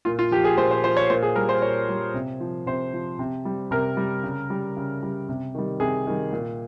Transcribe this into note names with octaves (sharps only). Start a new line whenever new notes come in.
A#2 F4
F4
F3 G4
G#4
A#2 C5
C5
F3 C5
C#5
A#2 C5
G#4
G3 A#4
C5
A#2 C#5
G3
C3
F3
C3 C5
F3
C3
G3
C3 A#4
G3
C#3
G3
C#3
G3
C3
D#3 G3
C3 G#4
D#3 G3
A#2